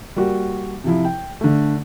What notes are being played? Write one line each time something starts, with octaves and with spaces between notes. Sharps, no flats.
G3 A#3 F#4
C3 F3 E4
G5
D3 A3